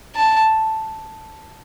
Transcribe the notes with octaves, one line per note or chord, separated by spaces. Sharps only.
A5